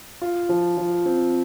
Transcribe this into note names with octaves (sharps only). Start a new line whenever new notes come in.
F4
F3
F3
C4